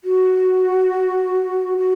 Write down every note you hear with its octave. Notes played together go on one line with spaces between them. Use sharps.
F#4
F#4